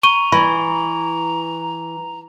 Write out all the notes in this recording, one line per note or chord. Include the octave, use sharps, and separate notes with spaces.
A#5 C#6 D#7 G7
E3 B5